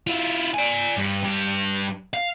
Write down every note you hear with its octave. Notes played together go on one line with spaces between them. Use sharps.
E4 F4
D5 G#5
G2
G2 G4
F5